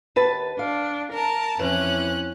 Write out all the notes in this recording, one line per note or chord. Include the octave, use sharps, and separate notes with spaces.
D#2 B4 A5
D4 F5
A#4 A5 A#5
F2 E3 C#4 F#6